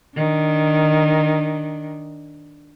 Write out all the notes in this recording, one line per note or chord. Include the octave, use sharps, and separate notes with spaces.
D#3 D4